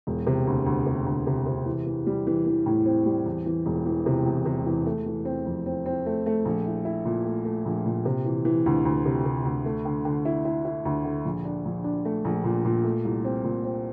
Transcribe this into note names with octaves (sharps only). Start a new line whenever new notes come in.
E1
C3
D2
D2
C3
D2
C3
C3
E3
E3
G3
E3
E3
A2
C4
G3
E2
E3
E1
E3
C3
E2
C3
E3
A3
E3
C4
F2
C4
C4
A3
A3
A#1
E4
E4
A#2
A3
A3
A#1
A#2
C3
E3
E3
D2
D2
C3
C3
D2
A3
D3
D3
E4
E4
E4
D2
D3
A#1
D4
A#1
D4
A3
A#1
A#2
A#2
A3
C2
C4
A#2
C4